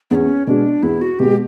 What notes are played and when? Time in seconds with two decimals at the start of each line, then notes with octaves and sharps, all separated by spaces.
0.11 E2 C#4 D4
0.47 B2 G#3 D4
0.83 E2 E4
1.01 F#4
1.19 B2 G#3 G4